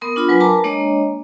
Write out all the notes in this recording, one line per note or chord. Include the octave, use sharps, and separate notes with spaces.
B3 A#4 C6 D#6
D4 F4 B5
F#3 B4 G#5
A#4 A5 A#5 D6
G#3 A#3 D4 C#5 D#5